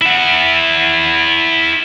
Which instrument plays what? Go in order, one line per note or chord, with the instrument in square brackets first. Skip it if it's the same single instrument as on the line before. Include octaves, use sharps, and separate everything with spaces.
[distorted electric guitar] E4 F#5